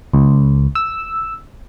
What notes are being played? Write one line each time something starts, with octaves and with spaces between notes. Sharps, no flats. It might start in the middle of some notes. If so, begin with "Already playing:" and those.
C#2
E6